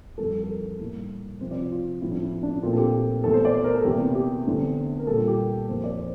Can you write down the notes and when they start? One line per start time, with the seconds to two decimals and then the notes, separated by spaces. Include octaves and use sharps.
0.18 F2 E3 G3 A4
0.43 A4
0.48 A#4
0.79 A2 G3 A#3
1.40 C3 F3 C4 C5
1.51 D5
1.61 F4
1.72 F4
2.01 A2 F3 C4 E4
2.11 D4
2.22 E4
2.43 D4
2.63 A#2 A3 C4 F4
2.73 A4
2.77 G4
2.93 G4
3.24 E2 E3 A3 A4
3.34 C5
3.45 D5
3.54 C5
3.64 A#4
3.74 A4
3.85 E2 C3 E3 A#3 G4
4.01 E4
4.15 G4
4.46 E2 D3 A3 C4
4.99 A#4
5.07 A#2 G3 A#3 A4
5.17 F4
5.28 G4
5.69 F2 E3 A#3 C5
5.84 D5
6.00 C5